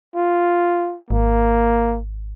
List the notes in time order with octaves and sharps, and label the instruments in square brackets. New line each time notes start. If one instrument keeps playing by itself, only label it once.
[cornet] F4
[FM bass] G#1 [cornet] A#3